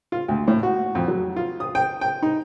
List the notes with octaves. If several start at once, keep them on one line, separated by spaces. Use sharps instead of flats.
F4
D2
A2
F#4
F2
F#3
F4
D#6
G5
G5
D#4